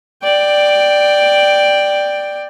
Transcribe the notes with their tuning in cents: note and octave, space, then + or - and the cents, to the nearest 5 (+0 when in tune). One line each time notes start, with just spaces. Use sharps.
D5 +10 G5 +0